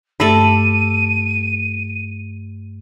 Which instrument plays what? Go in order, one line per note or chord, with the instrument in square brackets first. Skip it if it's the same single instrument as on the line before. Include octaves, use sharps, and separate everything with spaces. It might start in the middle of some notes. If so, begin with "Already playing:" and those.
[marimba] G2 A3 [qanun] A4 D5 E5 [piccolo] D#7